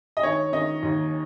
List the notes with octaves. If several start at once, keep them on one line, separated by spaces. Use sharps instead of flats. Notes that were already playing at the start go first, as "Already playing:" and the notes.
D#5
D#3 C#5
D#3 D#5
D#2